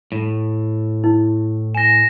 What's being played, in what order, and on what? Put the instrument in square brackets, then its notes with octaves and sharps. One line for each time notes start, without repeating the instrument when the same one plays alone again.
[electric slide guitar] A2
[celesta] E4
[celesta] G#5 [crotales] A#6 E7